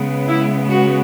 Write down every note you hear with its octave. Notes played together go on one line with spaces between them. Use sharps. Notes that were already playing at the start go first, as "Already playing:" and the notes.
Already playing: C#3 G#3 B3
E4
F#4